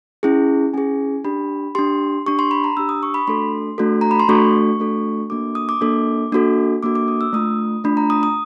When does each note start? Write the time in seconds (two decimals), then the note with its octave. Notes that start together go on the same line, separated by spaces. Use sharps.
0.23 C#4 E4 G#4
0.73 C#4 E4 G#4 G#5
1.25 D4 G4 B5
1.75 D4 G4 C6
2.26 D4 G4 C#6
2.39 C6
2.51 B5
2.64 A#5
2.77 D4 G4 E6
2.89 D#6
3.03 C#6
3.14 B5
3.27 A3 D4 F#4 A4 C6
3.78 A3 D4 F#4 A4
4.01 A#5
4.11 B5
4.19 C6
4.28 A3 D4 F#4 A4 C#6
4.80 A3 D4 F#4 A4
5.30 A#3 D4 F#4 A4 D6
5.55 D#6
5.69 D6
5.81 A#3 D4 F#4 A4
6.32 A#3 D4 F#4 A4
6.83 A#3 D4 F#4 A4 D6
6.95 D6
7.08 D#6
7.21 E6
7.33 A3 D4 F4 D#6
7.84 A3 D4 F4 B5
7.97 A#5
8.10 D#6
8.23 D#6